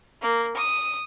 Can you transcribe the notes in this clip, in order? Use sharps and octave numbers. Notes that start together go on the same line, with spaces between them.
A#3
D#6